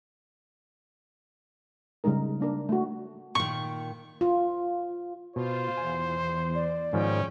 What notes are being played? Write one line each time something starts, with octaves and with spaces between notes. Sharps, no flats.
C#3 G3 G#3 D#4 A#4
A#3 D4 A#4
A3 F#4
A#2 D#3 C#6
F4
B2 F4 C5
E2 G#5
D5
G#2 D#3 F3 C#4 G5